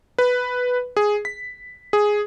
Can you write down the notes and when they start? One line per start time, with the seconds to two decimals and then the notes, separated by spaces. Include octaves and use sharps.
0.18 B4
0.97 G#4
1.25 B6
1.93 G#4